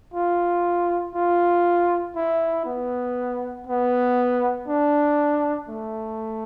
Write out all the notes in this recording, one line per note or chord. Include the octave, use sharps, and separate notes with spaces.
F4
F4
E4
B3
B3
D4
A3